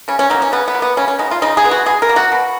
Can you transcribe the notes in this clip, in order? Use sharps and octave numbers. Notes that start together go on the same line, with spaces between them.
C#3 C#4
C#4
F#3 A#3 D#4
C#4
C#3 B3
B3
F#3
A#3 B3
C#3 C#4
C#4
G#3 B3 D#4
F4
C#3 D#4
G#4
G#3 B3
F#4
B2 G#4
A#4
A#3
F#4
B2